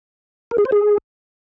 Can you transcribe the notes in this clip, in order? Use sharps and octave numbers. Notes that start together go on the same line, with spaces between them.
A#4
G#4
C5
G#4